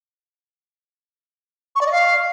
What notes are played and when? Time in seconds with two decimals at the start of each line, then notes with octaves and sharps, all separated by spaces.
1.76 C#6
1.81 D5
1.86 D#5
1.92 F5